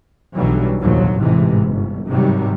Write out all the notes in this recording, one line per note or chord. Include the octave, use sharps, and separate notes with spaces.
B1 B2 D3 E3 F#3 G3
F1 A#1 D#2 F3 F#3
A1 G#2 C3 E3 G#3
G1
G#2 C3 D#3 F#3 G3